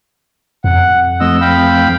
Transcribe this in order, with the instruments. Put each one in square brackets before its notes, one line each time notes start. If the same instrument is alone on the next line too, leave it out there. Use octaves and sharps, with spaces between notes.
[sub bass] F2 [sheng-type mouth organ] F#5
[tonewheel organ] F3 A3 C4 [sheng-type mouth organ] D#5 E6
[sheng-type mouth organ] F5 G5 B5